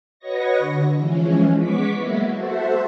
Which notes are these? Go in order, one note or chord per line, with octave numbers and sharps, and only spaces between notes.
F#4 B4 C#5 D#5 C#6 A#6
D3
E3 F3 G#3 C#4
G#3 B3 C#6 D6 B6
F#3 G#3 A#3 B3 E4 F#4
F#4 A4 C5 E5